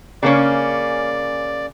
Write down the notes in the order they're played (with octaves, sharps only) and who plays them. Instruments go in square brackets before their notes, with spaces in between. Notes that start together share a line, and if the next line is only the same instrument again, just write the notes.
[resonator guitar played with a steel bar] C#3 A#3 C#4 [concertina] D5